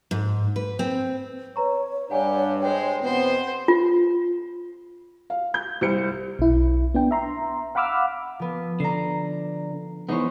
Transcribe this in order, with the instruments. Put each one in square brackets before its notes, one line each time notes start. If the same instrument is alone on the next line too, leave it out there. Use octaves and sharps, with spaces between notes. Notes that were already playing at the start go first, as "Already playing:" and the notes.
[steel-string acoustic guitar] G#2
B4
C4
[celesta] B4 A#5 C#6 [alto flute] C#5
[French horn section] G2 D4 [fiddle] G4 [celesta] F#5 G#5
[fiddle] G#3 C5 [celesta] G5
[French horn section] E2 B2 B3 [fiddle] C4 C5
[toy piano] F4
[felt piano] F5
G6
C2 C5 C#7
[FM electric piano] B1 E4
B3 D4 G5
E5 A#5 C6
F5 F#5 B5 D6 E6 F6
[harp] F3 B3
[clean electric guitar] D3 [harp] A#5 C7
[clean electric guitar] E3 G#3 B3 [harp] D#4 C5 C#5